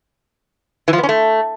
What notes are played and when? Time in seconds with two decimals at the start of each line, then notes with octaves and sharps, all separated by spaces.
0.88 E3
0.93 F3
0.98 B3
1.03 C#4
1.09 A3